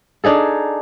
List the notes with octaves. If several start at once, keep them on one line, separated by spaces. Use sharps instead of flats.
D4 D#4 G#4 A4